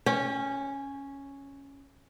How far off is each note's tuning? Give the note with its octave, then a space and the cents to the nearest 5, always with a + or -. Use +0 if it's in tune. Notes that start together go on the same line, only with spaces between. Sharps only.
C#4 +0 G5 +45